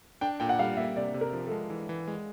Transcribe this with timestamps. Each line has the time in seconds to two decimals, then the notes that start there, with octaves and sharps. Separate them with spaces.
0.21 D4 G5
0.40 A#2 G5
0.49 F#5
0.59 G3 F5
0.77 A#3 E5
0.96 C3 D5
1.14 C3
1.21 A#4
1.33 F3
1.46 A4
1.52 G#3
1.70 E3
1.89 E3
2.07 G#3